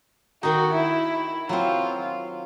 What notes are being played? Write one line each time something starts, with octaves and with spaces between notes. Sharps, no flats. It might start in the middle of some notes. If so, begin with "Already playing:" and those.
D#3 D#4 F#4
E4
F#3 C4 F4